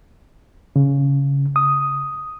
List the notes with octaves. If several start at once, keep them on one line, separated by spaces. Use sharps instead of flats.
C#3
D#6